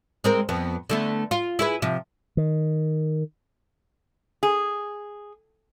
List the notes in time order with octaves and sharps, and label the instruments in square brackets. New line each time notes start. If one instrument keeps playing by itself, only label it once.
[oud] G#3 C4 A#4
F2 B3
D3 A3 B3
F4
E4 G#4 B4
C3 F3
[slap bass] D#3
[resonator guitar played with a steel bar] G#4